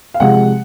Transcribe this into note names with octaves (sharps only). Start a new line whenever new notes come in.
F5
C3 F3 G#3 F#5